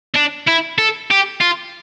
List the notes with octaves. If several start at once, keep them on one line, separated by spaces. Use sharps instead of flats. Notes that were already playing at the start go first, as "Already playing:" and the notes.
D4
E4
A4
G4
F4